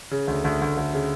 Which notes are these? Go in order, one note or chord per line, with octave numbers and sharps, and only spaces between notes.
C#3
D2
D2
D2
D2
C#3